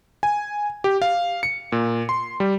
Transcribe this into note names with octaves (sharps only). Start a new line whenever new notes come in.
G#5
G4
F5
C#7
A#2
C6
G3